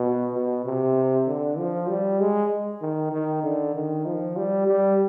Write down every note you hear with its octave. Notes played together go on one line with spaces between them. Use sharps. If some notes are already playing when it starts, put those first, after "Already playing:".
Already playing: B2
B2
C3
D3
F3
G3
G#3
D#3
D#3
D3
D#3
F3
G3
G3